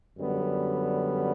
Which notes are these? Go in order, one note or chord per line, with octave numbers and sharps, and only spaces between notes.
F#2 D3 G3 B3